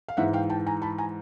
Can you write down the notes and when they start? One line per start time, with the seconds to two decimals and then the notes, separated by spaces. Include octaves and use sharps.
0.08 F5
0.17 G#2 E3 E5 F#5
0.33 F5 G5
0.50 G5 A5
0.66 G#5 A#5
0.82 A5 B5
0.98 G#5 A#5